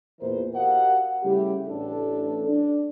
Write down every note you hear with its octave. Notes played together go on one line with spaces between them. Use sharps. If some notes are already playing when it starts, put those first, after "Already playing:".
E2 A#2 E3 A#4 C5
F#4 G4 A#4 D#5 F5 F#5
C#3 G3 A3 E4 G4
A1 D4 A4
D4